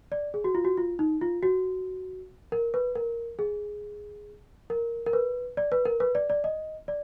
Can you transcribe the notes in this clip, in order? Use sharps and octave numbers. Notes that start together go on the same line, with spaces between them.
D5
G#4
F#4
F4
F#4
F4
D#4
F4
F#4
A#4
B4
A#4
G#4
A#4
A#4
B4
D5
B4
A#4
B4
D5
D5
D#5
D5